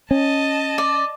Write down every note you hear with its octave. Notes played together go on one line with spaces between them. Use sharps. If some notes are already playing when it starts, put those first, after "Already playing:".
C#4 D#5 A5
D5